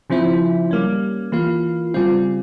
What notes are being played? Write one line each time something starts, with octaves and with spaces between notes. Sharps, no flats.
C#3 F3 C4 E4
G3 A#3 C#4
E3 A#3 F4
C#3 G3 C4 F4